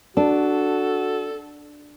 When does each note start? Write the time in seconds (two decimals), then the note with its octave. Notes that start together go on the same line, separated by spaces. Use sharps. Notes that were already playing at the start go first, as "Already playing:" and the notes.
0.17 D4 F#4 A4